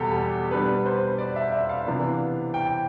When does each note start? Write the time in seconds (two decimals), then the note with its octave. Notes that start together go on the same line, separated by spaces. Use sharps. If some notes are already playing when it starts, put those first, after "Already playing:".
Already playing: E2 B2 G3 G4 A4
0.51 B2 G3 B3 D4 B4
0.86 C5
1.18 D5
1.36 E5
1.52 E5
1.69 F5
1.86 C3 E3 B3 D4
2.54 G5